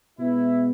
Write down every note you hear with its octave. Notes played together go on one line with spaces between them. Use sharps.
B2 G#3 B3 E4